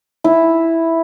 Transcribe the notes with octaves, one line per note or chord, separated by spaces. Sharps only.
E4